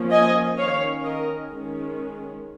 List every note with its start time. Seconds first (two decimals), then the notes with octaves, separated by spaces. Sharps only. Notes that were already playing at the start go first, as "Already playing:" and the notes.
Already playing: F3 A#3 C#4
0.11 D#5 G#5
0.58 D#3 C#4 C#5 F5
1.04 A#4 D#5
1.51 D#3 G#3 C#4